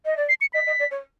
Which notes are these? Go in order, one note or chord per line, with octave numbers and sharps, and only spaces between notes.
D#5
D5
C7
C#7
D#5 B6
D#5
D5
C#5